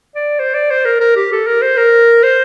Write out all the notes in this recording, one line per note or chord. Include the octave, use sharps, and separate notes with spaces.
D5
C5
D5
C5
A#4
A#4
G4
A4
A#4
C5
A#4
C5